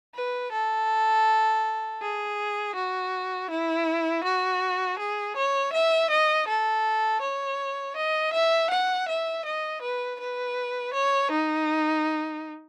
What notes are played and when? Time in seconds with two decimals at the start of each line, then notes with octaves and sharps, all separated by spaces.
0.15 B4
0.52 A4
2.01 G#4
2.75 F#4
3.50 E4
4.24 F#4
4.99 G#4
5.37 C#5
5.73 E5
6.10 D#5
6.48 A4
7.22 C#5
7.96 D#5
8.33 E5
8.71 F#5
9.08 E5
9.46 D#5
9.82 B4
10.20 B4
10.94 C#5
11.32 D#4